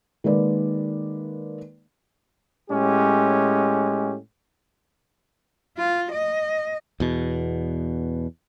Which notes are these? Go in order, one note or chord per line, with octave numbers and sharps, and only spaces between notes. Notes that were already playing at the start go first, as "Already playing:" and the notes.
D#3 G#3 A#3 B4 D5
A2 G#3 C#4 G4
F4
D#5
E2 B2